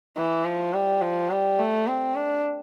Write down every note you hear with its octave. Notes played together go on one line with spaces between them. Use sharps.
E3
F3
G3
F3
G3
A3
C4
D4